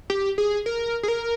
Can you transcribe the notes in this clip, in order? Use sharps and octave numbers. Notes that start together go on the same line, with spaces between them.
G4
G#4
A#4
G#4
A#4